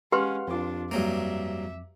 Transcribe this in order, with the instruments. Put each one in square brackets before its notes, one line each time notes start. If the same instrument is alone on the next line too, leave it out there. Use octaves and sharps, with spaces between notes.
[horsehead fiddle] G#3 C#4 [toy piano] G4 B4 C6 [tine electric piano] F5 F#5 F6
[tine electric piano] F2 D6 [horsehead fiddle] D4 F4
[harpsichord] G2 F#3 A#3 [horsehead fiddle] E5